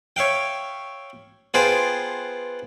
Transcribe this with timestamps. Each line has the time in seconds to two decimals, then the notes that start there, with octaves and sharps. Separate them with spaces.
0.16 C#5 E5 F5 G5
1.54 B3 F4 G#4 C5 G5 A5